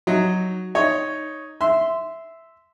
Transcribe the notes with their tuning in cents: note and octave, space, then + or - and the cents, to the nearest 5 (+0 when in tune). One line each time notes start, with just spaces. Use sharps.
F#3 +0 D#4 +5
D#4 +0 C#5 +0
E5 +0 C6 -15